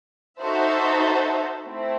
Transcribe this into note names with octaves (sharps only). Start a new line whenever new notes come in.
D#4 F#4 A4 C5 E5
A3 C4 E4